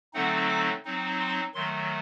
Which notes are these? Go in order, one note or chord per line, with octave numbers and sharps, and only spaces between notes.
D3 F#3 A3 C4 D#4 F#5
D6
F#3 C4 D#4
C6
D#3 F#3 A3 C6